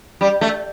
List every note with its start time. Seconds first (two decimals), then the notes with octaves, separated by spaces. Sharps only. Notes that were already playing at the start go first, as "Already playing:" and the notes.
0.21 G3
0.41 A3